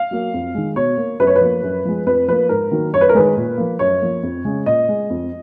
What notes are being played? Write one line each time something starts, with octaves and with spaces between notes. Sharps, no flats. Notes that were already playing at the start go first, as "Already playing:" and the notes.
Already playing: F5
F#3 A#3
F2
D#3 G#3
B2 C#5
A#3
F#2 B4
C#5
B4
F3 A#3
F#2
F3 G#3
F2 B4
F3 A#3 B4
G#2 A#4
D#3 F#3 A#3
F#2 C#5
B4
A#4
D#3 G#3 B4
A#2
F3 A#3
F#2 C#5
F3 A#3
F2
C#3 G#3
A#2 D#5
G#3
F2